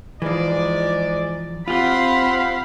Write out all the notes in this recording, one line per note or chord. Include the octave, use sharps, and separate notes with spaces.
G#2 E3 F3 G#3 D5
C4 F4 G4 F5 F#5 B5 C6